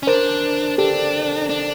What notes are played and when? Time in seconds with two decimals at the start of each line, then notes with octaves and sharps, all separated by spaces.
0.03 C#4
0.07 D4 A#4 C5
0.78 D4 G4 A4
1.50 D4